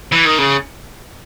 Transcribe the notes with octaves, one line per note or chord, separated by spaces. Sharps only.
E3
D#3
C#3